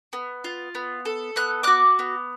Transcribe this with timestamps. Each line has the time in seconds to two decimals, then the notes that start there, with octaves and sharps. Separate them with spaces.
0.13 B3
0.44 F4
0.75 B3
1.05 A4
1.36 B3 F#6
1.63 F#4 D6 F#6
1.99 B3